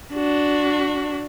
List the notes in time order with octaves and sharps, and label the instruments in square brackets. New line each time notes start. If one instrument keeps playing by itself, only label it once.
[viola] D4 F#4